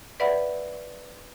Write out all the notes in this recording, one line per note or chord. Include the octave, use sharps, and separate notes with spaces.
B4 D5 E5 F#5 B5